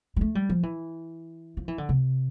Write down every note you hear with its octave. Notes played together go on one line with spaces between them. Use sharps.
G3
A3
G3
F3
E3
F3
E3
D3
C3